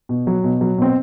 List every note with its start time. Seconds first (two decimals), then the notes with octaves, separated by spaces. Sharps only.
0.09 B2
0.27 F#3
0.44 B2
0.61 F#3
0.78 B2 C4